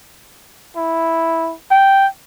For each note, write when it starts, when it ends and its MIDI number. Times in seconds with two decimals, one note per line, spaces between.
0.77 1.54 64
1.71 2.09 79